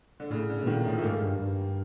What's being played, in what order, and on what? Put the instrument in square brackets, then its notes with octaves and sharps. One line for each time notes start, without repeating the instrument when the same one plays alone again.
[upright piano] D3
[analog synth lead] A2 [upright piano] C#3
[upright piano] D3
[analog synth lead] B2
[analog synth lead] A#2 [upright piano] D#3
[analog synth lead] A2 [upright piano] F3
[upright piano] A3
[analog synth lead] G#2 [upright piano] A#3
[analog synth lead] G2
G2